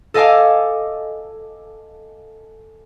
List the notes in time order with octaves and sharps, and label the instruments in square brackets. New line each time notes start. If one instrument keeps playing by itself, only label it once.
[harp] A4 D#5 F5 G#5 A5 D6